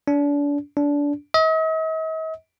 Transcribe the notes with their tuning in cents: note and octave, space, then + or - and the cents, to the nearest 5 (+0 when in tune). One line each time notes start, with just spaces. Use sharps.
D4 -35
D4 -25
D#5 +45